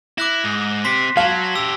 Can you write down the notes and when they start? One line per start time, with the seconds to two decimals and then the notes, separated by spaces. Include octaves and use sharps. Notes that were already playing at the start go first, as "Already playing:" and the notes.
0.18 E4 D6 F#6 A#6
0.44 G#2
0.85 C4 G4 C6 B6 C7
1.17 F#3 F5 A5 G#6
1.56 C#4 G4 E6